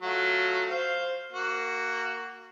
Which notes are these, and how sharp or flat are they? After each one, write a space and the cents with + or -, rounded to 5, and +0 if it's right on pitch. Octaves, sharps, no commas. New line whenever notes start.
F#3 +0 A3 +0 F4 +10
C5 +0 F5 +0
A#3 -15 F#4 +10